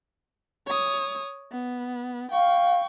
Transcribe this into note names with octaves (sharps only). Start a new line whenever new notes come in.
C#5 D#6
B3
F5 G5 C#6